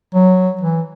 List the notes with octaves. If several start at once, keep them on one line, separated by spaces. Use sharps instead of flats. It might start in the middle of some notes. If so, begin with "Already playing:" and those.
F#3
E3